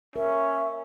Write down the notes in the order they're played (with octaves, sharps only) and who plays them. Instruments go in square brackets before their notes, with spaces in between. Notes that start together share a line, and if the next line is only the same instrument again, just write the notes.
[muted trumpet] C#4 [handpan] A#4 [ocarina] E5